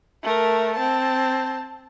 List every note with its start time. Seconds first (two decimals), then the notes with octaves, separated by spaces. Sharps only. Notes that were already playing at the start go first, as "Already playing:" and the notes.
0.23 A3 A#4
0.75 C4 A5